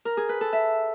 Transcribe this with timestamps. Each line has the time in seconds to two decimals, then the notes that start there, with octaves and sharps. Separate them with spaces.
0.05 A#4
0.17 G#4
0.29 B4
0.41 A4
0.53 E5